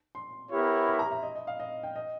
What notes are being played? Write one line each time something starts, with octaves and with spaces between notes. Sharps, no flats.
C6
B3 E4 G4 A#4 C#5
B5
A#5
E5
D#5
D#5
F5
D#5
G5
D#5